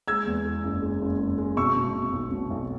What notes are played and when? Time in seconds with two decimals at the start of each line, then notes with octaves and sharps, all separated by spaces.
0.08 G#3 E6 G#6
0.26 E2
0.46 G#3
0.64 F#1
0.82 G#3
1.02 F#1
1.20 G#3
1.38 G#3
1.57 B2 C#6 E6
1.76 B2
1.95 B2
2.13 B1
2.31 B2
2.50 B1